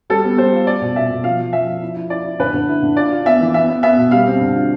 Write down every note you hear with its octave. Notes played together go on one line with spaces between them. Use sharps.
G3 A4
B3
G3 C5
F4
F4 D5
B2
B2 E5
B2
F3 F5
F3
F3 E5
F3
E4
E4
E4 D5
E4
D3 B4
D3
E4
D3
F4 D5
F4
B3 E5
E3
B3 E5
B3
B3 E5
B2
G3 F5
C4
D3
F4